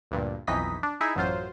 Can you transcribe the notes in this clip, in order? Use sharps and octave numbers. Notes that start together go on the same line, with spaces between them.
D2 G2 A#2
B1 F2 E3 D#4 D#5 B6
D4
D#4 E4 G#4 E5
A1 F#2 F#3 F4 C5